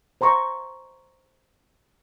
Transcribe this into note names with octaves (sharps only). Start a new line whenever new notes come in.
C5 A#5 C6 C#6